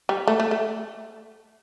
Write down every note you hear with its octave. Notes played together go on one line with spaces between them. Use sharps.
G3
A3
A3
A3